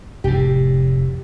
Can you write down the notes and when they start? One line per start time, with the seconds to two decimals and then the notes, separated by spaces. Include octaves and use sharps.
0.24 F1 A2 G4